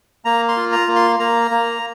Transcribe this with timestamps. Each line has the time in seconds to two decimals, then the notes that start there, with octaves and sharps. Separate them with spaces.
0.25 A#3 A#5
0.48 C6
0.57 F4
0.72 A#5
0.88 A#3
0.96 C6
1.19 A#3 A#5
1.51 A#3